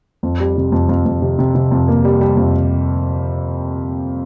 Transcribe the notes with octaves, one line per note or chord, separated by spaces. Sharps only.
F2
G3
C3
F2
F2
F2
C3
C3
C3
F2
A#3
G3
G3
F2